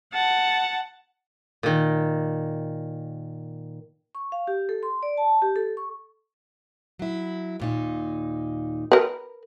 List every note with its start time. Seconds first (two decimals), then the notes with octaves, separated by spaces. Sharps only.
0.12 F#5 A5
1.63 A#2 D#3
4.15 C#6
4.32 F5
4.47 G4
4.69 A4
4.83 C6
5.03 D5
5.17 A5
5.42 G4
5.56 A4
5.77 C#6
6.99 F#3 E4
7.60 D#2 A#2 D#4
8.92 A#4 B4